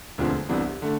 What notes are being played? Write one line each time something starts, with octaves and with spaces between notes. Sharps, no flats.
E1 D2 D3 F3 C4
C2 C3 E3 B3 D4
D3 A3